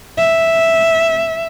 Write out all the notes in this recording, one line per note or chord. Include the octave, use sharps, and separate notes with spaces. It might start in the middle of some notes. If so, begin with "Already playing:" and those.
E5